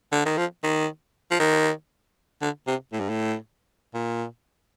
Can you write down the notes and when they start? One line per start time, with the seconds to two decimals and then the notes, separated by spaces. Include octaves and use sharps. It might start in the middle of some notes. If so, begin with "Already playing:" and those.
0.12 D3
0.25 D#3
0.37 F3
0.63 D#3
1.31 F3
1.40 D#3
2.42 D3
2.68 C3
2.92 A2
3.00 G2
3.10 A2
3.94 A#2